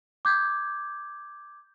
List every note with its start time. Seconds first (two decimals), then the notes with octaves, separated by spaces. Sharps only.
0.25 D6 G6 G#6